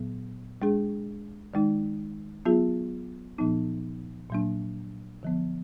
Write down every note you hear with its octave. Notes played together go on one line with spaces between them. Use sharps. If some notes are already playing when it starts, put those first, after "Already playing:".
Already playing: A#2 F#3 B3
G#3 D4 G#4
D#3 G#3 D#4
F#3 B3 F4 G#4
A#2 F3 B3 D#4
A#2 F#3 A#3 D4
D3 F3 B3